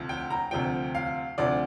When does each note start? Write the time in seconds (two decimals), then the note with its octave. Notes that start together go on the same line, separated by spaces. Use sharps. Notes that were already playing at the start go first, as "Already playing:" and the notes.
Already playing: D2 C3 F3
0.09 G5
0.30 A#5
0.51 D2 C3 F3 G5
0.95 F5
1.38 D2 C3 F3 D5